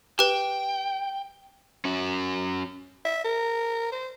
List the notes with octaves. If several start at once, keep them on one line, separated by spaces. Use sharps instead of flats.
G4 B4 G5
C#4 F#4
E5
A#4
C5